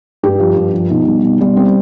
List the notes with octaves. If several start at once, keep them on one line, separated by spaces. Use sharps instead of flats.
G2 G4
F3
G2
F3
B2 D#4
G3
B2
G3
C4